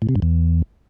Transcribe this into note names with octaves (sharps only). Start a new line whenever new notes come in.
A2
C3
G2
E2